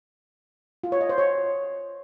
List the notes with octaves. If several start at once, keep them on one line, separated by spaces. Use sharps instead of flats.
F4
C#5
D#5
C5
C#5